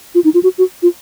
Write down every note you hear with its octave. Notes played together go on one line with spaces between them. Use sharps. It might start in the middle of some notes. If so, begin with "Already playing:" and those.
F4
D#4
F4
F#4
F#4
F4